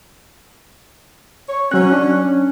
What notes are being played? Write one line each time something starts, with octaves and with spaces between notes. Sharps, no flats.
C#5
F#3 C#4 F#6
D4